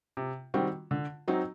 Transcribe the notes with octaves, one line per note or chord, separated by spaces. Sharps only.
C3
D#3 G3 C4 F#4
D3
F#3 C4 D#4 F#4